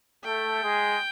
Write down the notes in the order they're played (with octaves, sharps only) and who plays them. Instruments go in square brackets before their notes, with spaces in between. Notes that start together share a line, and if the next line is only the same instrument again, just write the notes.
[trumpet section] A3 A4 [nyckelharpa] G5
[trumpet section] G#3 G#4